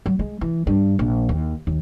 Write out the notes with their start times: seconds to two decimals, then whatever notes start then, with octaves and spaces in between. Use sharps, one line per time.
0.06 F#3
0.19 G#3
0.41 E3
0.67 G2
0.99 A#1
1.29 D#2
1.67 D#2